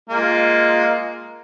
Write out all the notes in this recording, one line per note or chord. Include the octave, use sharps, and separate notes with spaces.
G#3 A#3 F4